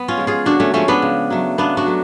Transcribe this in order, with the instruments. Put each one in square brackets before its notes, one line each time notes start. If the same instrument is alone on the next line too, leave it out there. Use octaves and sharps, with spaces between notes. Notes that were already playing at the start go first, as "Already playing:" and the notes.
Already playing: [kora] B3
C#4 F4
F3 G#3
F4 G#4
D3 D4 F#4
A3 C#4
F3 G#3 A3 C#4
B3 D4
C#3
F#3 A3
C#3 B3 D4
D4 F#4
F#3 A3